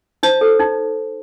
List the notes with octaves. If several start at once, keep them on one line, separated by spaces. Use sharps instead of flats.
D#4 C5
A4
D#4